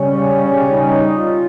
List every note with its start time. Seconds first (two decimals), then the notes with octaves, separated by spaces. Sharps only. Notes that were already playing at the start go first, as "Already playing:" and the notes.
Already playing: C#3 G3 C#4
0.71 D#4
1.16 F4